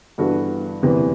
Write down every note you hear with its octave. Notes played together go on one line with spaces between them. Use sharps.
G2 E3 B3 F#4 A4
F#1 E2 C3 E3